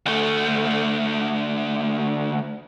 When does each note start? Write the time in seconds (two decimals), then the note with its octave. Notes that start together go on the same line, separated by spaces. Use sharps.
0.06 D2 A3